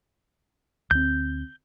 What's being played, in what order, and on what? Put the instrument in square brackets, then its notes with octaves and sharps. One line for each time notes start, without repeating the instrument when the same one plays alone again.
[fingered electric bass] D2 C4 [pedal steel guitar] G6